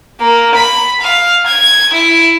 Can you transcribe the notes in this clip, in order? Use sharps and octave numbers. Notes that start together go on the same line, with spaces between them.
A#3
B5
F5
G#6
E4